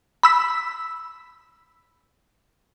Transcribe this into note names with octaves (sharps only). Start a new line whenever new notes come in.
B5 E6 B6